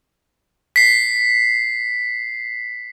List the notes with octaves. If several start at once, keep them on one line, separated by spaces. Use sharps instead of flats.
B6 C7